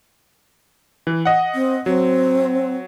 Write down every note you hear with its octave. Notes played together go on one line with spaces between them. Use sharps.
E3
D#5 F#5
C4
F#3 C4